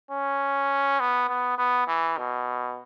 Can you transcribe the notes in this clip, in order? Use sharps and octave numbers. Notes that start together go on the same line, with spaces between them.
C#4
B3
B3
B3
E3
B2